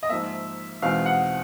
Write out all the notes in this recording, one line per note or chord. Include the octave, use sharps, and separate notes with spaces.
D#5
G#2 F3 A#3 E5
E2 B2 G#3 C4 D#4 F5
F#5